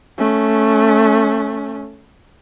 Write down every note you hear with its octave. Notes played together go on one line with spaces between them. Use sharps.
A3 C#4